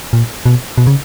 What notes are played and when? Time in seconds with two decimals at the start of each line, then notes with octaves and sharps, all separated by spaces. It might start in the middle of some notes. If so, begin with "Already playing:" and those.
0.13 A#2
0.46 B2
0.78 B2
0.87 C#3